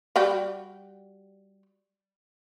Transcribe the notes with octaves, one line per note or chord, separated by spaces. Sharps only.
G3 F#4 G4